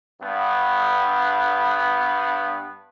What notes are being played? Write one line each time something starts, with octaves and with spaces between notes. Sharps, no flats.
G2 B3